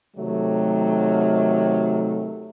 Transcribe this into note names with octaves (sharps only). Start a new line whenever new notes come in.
C3 D#3 F#3 A3